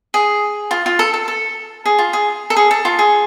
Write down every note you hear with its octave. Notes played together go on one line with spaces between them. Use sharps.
G#4
F4
F4
A4
A4
A4
G#4
F4
G#4
A4
G#4
A4
F4
G#4